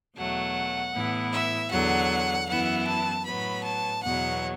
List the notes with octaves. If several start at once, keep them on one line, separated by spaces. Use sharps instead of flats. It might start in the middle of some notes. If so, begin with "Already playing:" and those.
E2 B2 F#3 A3 F#5
A2 E3 B3 E4
E5
E2 D3 F#3 F#5
F#2 E3 B3 E4 F#5
A5
A2 F#3 B3 B5
A5
E2 B2 F#3 F#5